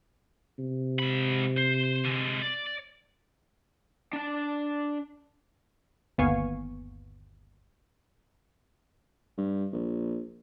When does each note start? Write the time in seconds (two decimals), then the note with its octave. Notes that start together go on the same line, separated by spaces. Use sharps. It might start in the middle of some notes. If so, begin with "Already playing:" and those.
0.59 C3
0.99 G#2 B5
1.57 C5
2.05 D3 G#3
2.42 D5
4.13 D4 A5
6.18 G1 D#2 B3 F5 G#5 C#6
9.38 G2
9.73 A#1